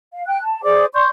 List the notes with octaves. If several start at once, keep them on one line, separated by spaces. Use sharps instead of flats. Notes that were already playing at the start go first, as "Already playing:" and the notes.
F5
G5 F#6
A5
G#4 C5 D5 D6
D5 C6 C#6 G6